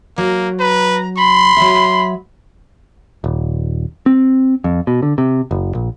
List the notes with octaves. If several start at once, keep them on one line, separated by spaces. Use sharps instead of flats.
F#3 A#3
B4 A#5
B5 C6
F#3 E5
D#1
C4
F2
B2
D3
C3
F#1
A#1